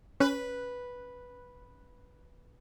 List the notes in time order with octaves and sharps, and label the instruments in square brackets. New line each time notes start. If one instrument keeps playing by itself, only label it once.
[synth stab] C#4 [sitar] B4